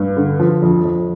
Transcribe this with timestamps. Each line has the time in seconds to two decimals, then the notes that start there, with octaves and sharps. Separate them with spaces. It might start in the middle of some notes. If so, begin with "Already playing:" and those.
Already playing: G2
0.17 D3
0.40 F3
0.62 F2
0.84 F2